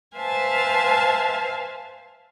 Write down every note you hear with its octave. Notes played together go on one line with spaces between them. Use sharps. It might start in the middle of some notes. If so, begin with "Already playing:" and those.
B4 C5 E5 F5 G#5 A5